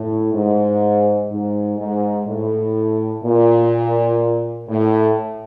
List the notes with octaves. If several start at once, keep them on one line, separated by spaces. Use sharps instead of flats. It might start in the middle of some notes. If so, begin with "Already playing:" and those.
Already playing: A2
G#2
G#2
G#2
A2
A#2
A2